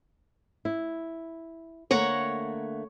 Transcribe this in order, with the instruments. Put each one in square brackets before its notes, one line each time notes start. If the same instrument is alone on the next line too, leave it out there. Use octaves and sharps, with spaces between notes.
[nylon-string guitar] E4
[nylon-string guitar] D3 A3 A#3 [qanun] C#5 F#5 A#5